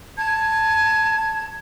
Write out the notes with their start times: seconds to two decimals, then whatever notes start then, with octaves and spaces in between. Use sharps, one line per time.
0.18 A5 G#6